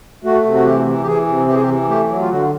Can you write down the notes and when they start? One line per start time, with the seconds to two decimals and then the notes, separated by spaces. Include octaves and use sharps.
0.24 A3 F#4
0.45 C3
0.55 F#4
0.65 E3 G4
0.86 E3
1.02 G4
1.06 E3 G#4
1.27 C3
1.47 E3 G4
1.54 G#4
1.62 G4
1.68 E3
1.89 A3 G4
2.09 F#3
2.21 F4
2.29 D3 F#4